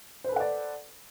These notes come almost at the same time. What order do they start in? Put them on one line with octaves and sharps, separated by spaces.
C5 B4 A4 F#5 D5